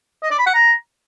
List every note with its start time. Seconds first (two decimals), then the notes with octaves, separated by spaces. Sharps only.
0.22 D#5
0.30 D5
0.38 B5
0.46 F#5
0.54 A#5